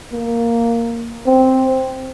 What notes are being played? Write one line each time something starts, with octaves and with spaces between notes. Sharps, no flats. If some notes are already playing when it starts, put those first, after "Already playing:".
A#3
C4